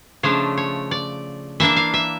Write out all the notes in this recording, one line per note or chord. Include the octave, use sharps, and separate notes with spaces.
C#3 F3 A3 D4 C#5
C#5
D5
E3 A#3 D4 E5
F5
E5